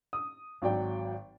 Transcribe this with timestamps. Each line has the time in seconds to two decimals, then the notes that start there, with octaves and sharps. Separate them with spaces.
0.13 D#6
0.62 G#1 F#3 D5 G5